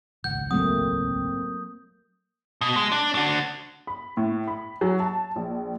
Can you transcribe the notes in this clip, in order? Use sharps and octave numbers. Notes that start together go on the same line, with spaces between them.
D#1 G#1 C#2 F#5 G6
F#3 A3 A#3 C4 D#6
B2
G#3
D4
D4 F#4
B5
A2
B5
F#3
A5
A#1